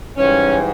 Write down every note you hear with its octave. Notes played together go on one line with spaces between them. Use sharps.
G#2 E3 G3 C#4